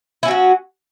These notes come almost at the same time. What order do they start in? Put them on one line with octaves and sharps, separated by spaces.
E4 C#4 F#3 F#4